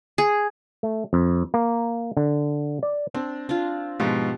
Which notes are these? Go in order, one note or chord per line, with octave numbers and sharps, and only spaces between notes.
G#4
A3
F2
A#3
D3
D5
C4 D4
D4 F4
G#2 B2 F3 G4